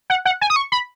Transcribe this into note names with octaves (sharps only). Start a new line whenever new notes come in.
F#5
F#5
G#5
D#6
C#6
B5